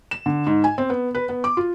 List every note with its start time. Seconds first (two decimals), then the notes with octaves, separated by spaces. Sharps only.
0.11 E7
0.26 D3
0.47 G#2
0.64 G#5
0.78 C4
0.90 B3
1.15 B4
1.29 B3
1.44 D6
1.57 F4